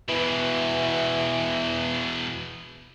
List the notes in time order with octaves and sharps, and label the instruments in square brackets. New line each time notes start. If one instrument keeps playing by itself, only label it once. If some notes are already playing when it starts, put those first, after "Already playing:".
[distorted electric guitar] E2 B2 [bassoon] E3